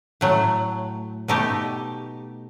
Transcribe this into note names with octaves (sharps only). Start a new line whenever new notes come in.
A2 F#3 A3
B2 A3 D#4 G4